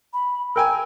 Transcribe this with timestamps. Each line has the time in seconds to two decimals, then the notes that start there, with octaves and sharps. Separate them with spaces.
0.14 B5
0.56 A#4 G5 G#5 E6